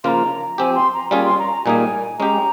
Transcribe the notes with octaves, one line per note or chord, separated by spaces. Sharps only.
C#3 F3 A#3 F4 A#5 C6
F3 C4 G4 G#5
C6
A#5
G3 A#3 C#4 F4 G#4 G#5
C6
A#5
A#5
A#2 G3 A#3 D#4 G#4 G#5
G#3 C#4 G4 A#5